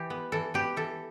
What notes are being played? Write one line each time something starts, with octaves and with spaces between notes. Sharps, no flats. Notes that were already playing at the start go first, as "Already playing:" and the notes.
Already playing: E3 G4
B3
E3 A4
B3 G4
E3 A4